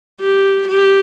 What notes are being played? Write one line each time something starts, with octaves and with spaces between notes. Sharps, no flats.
G4
G4